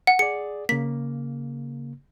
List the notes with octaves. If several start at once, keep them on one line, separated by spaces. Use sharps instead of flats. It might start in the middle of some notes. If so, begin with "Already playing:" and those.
F#5
G#4 D5 C#7
C#3 A#3 B6